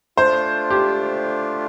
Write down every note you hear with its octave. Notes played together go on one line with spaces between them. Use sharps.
A3 D4 F4 C5
G4